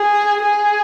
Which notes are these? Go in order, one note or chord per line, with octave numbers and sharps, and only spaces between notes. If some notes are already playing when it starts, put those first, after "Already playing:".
Already playing: G#4
G#4